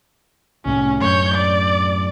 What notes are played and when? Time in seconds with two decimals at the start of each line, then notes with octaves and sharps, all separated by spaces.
0.65 C2 A2 C#4
1.00 F#2 A2 C#5 G6
1.35 D5